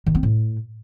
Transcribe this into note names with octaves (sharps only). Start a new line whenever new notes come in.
D#3
C4
A2